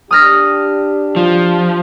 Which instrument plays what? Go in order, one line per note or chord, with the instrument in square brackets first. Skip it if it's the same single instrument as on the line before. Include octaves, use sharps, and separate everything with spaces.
[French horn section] D4 G4 [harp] D#6 F6 A#6
[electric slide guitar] F3